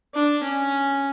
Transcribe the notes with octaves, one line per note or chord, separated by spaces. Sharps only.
D4
C#4